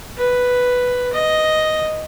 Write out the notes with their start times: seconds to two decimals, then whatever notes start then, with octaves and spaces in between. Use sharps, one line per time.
0.18 B4
1.13 D#5